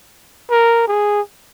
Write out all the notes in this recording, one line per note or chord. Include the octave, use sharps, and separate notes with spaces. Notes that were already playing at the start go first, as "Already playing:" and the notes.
A#4
G#4